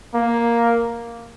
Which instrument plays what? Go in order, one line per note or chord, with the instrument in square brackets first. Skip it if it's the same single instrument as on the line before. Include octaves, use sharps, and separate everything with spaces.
[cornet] A#3